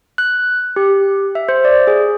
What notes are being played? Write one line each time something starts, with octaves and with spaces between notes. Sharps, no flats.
F#6
G4
E5
C5
D5
G#4